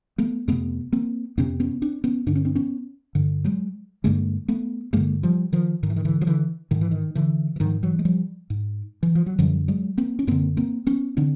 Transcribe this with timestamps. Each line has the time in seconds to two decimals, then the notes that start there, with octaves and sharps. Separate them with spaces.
0.18 A3 B3
0.48 F2 C3 A3 B3
0.92 A#3 C4
1.37 F2 C3 B3 C#4
1.60 B3 C#4
1.82 C4 D4
2.04 B3 C#4
2.27 G2 D3 D4
2.35 C#4
2.45 C4 D4
2.55 B3 C#4
3.15 G2 D3
3.44 F#3 G#3
4.04 G2 D3 G#3 A#3
4.48 A3 B3
4.93 G2 D3 G#3 A#3
5.23 F3 G3
5.53 D#3 F3
5.83 G#2 D#3
5.90 E3
5.96 D#3
6.05 D3 E3
6.21 F3
6.27 D3 E3
6.71 G#2 D#3
6.81 E3
6.91 D#3
7.15 D3 E3
7.56 E3
7.60 G#2 D#3 F3
7.83 E3 F#3
7.99 G#3
8.05 F3 G3
8.50 G#2
9.03 E3
9.15 F3
9.26 F#3
9.39 F#2 D3 F3 G3
9.68 F#3 G#3
9.98 A#3 C4
10.19 C#4
10.27 F#2 D3 A#3 C4
10.57 A#3 C4
10.87 B3 C#4
11.17 D3 C4 D4